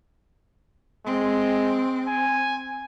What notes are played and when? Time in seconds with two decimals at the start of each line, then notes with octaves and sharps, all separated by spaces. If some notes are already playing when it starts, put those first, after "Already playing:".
1.06 G#3 C4
2.08 G#5